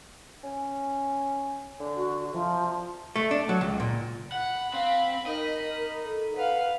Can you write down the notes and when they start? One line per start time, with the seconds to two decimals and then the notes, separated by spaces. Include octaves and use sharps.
0.44 C#4
1.80 D3
1.96 F#4
2.34 C3 F3
3.16 A3
3.31 D4
3.49 F#3
3.61 C#2
3.80 A#2
4.32 F#5 B5
4.74 C4 F5
5.26 D#4 A#4 D#5
6.04 A4
6.36 B4 F5 F#5